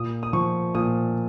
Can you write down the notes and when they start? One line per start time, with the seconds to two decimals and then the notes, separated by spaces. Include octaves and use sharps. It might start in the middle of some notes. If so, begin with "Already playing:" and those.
Already playing: A#2 D#6
0.23 D#6
0.33 F3 C#6
0.75 A#2 D#6